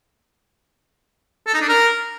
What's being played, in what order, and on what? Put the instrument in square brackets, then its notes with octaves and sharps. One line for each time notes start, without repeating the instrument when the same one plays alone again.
[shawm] A4
D#4
D4
A#4